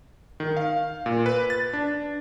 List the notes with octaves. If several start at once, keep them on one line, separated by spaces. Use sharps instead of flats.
D#3
F5
A#2
B4
A6
D4